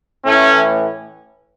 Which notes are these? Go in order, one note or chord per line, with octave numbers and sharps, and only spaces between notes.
A2 E3 A3 C#4